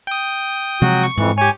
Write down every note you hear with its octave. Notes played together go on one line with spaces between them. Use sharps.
G5 D#6
C3 F3 F#3 G#3 F#4
C#6
F2 G#2 E3
G4 C#5 G#5